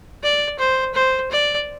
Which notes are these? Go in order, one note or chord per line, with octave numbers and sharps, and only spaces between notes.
D5
C5
C5
D5